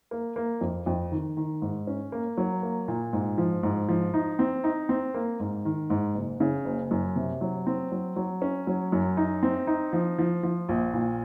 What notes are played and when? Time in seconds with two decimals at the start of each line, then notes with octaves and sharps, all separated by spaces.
0.11 A#3
0.36 A#3
0.61 F2
0.86 F2
1.12 D#3
1.37 D#3
1.62 G#2
1.87 C#4
2.12 A#3
2.38 F#3
2.63 A#3
2.88 A#2
3.13 G#2
3.38 F3
3.63 G#2
3.89 F3
4.14 D#4
4.39 C4
4.64 D#4
4.89 C4
5.14 A#3
5.40 G#2
5.65 D#3
5.90 G#2
6.15 F#1
6.40 C#3
6.65 F#1
6.91 F#2
7.16 C3
7.41 F#3
7.67 C4
7.92 F#3
8.16 F#3
8.42 C#4
8.67 F#3
8.92 F#2
9.17 D#4
9.43 C4
9.67 D#4
9.93 F3
10.18 F3
10.43 F3
10.69 A#1
10.93 A#2